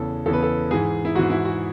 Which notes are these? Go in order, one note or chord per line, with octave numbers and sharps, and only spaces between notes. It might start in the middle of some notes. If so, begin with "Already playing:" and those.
Already playing: E2 C#3 E3 A4
E2 C#3 E3 A4
B4
A4
G#2 E3 G#4
E4
G#2 E3 F#4
E4
F#4